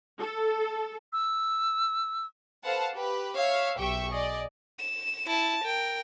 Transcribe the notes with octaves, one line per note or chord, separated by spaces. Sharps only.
A4
E6
A4 B4 C5 F5 F#5 A5
G4 B4
C#5 E5 F5
B1 G4 E5 G5 C#6
G#4 D5 D#5
E7
E4 A5
A#4 G5